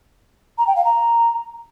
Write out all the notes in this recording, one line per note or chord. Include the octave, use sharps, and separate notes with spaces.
A#5
G5
F5
A#5